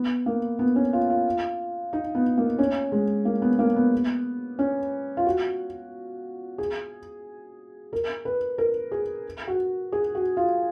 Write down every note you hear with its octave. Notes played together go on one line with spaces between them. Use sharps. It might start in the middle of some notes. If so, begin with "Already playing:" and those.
Already playing: B3
A#3
B3
C#4
F4
F4
D#4
B3
A#3
C#4
G#3
A#3
B3
A#3
B3
C#4
F4
F#4
G#4
A#4
B4
A#4
G#4
F#4
G#4
F#4
F4